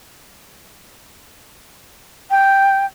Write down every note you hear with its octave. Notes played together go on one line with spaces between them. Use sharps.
G5